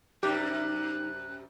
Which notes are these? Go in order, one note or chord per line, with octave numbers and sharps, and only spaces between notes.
F#2 C3 G3 D#4 G4 F#6